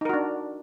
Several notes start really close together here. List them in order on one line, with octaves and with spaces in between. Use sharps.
D#4 A#4 F#4 D4